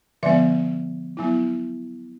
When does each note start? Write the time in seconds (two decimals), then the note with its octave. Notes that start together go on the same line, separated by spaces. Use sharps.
0.23 D3 F3 G#3 B3 D5 E5
1.17 F#3 B3 E4